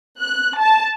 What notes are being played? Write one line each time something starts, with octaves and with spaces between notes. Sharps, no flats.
F#6
A5